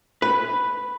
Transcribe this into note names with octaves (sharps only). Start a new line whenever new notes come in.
B4